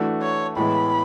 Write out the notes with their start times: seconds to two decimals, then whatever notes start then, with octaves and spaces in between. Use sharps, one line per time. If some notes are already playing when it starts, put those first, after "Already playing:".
Already playing: E3 A3 D4 F#4
0.22 C#5
0.56 A2 E3 G#3 B3 B5